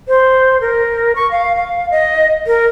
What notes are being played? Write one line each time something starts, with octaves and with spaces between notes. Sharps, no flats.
C5
A#4
C#6
F5
F5
D#5
A#4